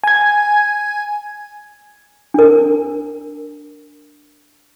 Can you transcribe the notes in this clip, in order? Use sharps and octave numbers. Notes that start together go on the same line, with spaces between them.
G#5 G#6
D4 A#4